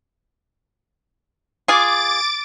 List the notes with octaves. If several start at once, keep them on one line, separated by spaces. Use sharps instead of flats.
F4 G#4 D6 A6 D7